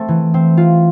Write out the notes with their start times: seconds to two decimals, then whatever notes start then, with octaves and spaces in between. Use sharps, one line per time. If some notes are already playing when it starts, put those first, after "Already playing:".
Already playing: A3 C4
0.08 E3
0.34 C4
0.57 F4